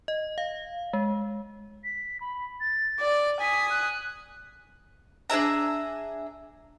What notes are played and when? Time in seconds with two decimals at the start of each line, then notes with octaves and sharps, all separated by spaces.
0.08 D#5
0.38 F5
0.93 G#3
1.84 B6
2.21 B5
2.60 A6
3.00 D5
3.41 G#5 D#6 B6
3.70 F#6
5.30 D4 G#4 E5 A#5